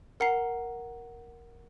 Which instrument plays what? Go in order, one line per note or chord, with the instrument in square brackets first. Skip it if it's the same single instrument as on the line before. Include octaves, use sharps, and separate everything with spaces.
[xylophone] A#4 F#5 A#5 C7